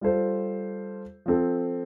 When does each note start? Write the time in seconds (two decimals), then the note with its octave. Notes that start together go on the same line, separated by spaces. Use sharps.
0.01 G3 F4 A4 C5
1.26 F3 C4 A4